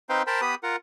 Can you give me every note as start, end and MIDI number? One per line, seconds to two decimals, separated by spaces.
0.09 0.23 60
0.09 0.23 63
0.09 0.23 71
0.09 0.23 72
0.09 0.23 77
0.09 0.23 79
0.27 0.41 70
0.27 0.41 72
0.27 0.41 79
0.27 0.41 81
0.27 0.41 83
0.41 0.55 59
0.41 0.55 67
0.41 0.55 71
0.41 0.55 83
0.41 0.55 87
0.63 0.76 65
0.63 0.76 70
0.63 0.76 78